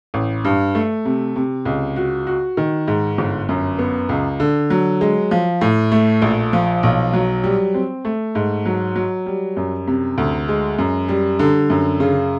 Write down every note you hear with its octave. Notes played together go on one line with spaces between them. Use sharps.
A1
G2
A3
C3
C3
C#2
F#4
F#4
D#3
G#2
G1
F#2
B3
C#2
D3
F#3
G#3
F3
A2
A3
A#1
F3
B1
F#3
G3
C4
A3
G#2
F#3
F#3
G3
F#2
C3
D2
G#3
F#2
G3
D3
F#2
C#3